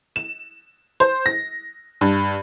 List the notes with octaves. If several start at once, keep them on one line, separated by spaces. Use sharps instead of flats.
E7
C5
A#6
G2